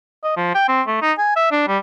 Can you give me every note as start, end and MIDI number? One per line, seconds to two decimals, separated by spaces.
0.24 0.35 75
0.37 0.50 53
0.55 0.68 79
0.68 0.82 60
0.87 0.99 57
1.02 1.12 63
1.18 1.33 80
1.36 1.47 76
1.51 1.66 62
1.68 1.78 55